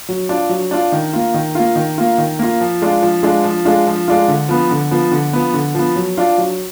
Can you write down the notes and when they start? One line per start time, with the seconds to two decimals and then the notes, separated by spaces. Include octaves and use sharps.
0.09 F#3
0.29 D4 F4
0.50 F#3
0.71 D4 F4
0.92 D#3
1.13 A#3 F4
1.34 D#3
1.55 A#3 F4
1.76 D#3
1.98 A#3 F4
2.18 D#3
2.39 A#3 F4
2.61 F3
2.82 G#3 D4 F4
3.02 F3
3.23 G#3 D4 F4
3.44 F3
3.65 G#3 D4 F4
3.86 F3
4.08 G#3 D4 F4
4.28 D3
4.49 F3 B3
4.71 D3
4.91 F3 B3
5.12 D3
5.33 F3 B3
5.54 D3
5.75 F3 B3
5.96 F#3
6.17 D4 F4
6.38 F#3